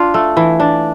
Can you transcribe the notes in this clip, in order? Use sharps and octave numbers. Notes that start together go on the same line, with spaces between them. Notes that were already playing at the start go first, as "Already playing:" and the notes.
Already playing: D4 F4
A3
E3
D4